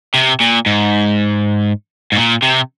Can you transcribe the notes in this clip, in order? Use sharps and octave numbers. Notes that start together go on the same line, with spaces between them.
C3
A#2
G#2
G#2
A#2
C3